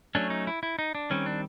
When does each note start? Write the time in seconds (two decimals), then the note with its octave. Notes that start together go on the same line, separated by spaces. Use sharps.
0.15 F#3 A3 C#4 D4
0.30 D#4
0.47 E4
0.63 E4
0.79 D#4
0.95 D4
1.10 D#3 G3 C4 C#4
1.26 D4